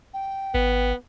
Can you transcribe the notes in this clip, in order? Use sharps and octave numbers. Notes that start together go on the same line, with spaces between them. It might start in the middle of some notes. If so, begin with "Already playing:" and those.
G5
G#1 B3